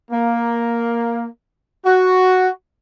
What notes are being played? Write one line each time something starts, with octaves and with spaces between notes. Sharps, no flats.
A#3
F#4